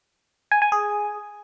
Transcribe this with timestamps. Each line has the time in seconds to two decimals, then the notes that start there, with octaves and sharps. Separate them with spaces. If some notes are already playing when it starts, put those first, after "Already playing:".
0.51 G#5
0.62 G#5
0.72 G#4